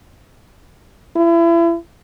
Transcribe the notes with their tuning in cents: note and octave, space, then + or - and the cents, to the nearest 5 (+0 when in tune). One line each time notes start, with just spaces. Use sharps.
E4 +35